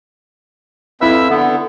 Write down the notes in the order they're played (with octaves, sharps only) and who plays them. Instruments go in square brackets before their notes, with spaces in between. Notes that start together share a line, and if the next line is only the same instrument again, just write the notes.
[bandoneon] F2 E5 E6 [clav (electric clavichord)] E4 B4
[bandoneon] D3 B3